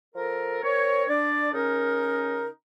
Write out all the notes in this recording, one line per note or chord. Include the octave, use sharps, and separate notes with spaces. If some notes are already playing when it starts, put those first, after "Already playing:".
F3 A4 A#4
C4 A#4 C#5
D4 D5
C#3 C#4 D#4 A#4